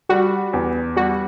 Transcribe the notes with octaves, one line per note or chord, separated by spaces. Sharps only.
G3 F#4
E2
G3 F#4